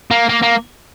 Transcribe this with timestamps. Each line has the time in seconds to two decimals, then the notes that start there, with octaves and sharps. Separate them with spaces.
0.11 A#3
0.29 A#3
0.43 A#3